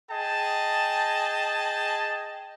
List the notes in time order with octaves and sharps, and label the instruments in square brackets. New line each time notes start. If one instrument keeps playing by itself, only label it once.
[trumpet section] G#4 D#5 G5 A5